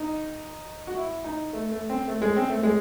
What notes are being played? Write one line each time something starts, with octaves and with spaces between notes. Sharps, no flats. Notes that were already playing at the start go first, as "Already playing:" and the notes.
Already playing: D#4
F#4
E4
D#4
A3
A3
C4
A3
G#3
C4
A3
G#3